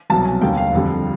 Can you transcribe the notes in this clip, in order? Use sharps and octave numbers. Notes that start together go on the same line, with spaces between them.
C2 B2 F#3 A5
G#5
D#2 D3 G3 G5
F5
F2 D3 G3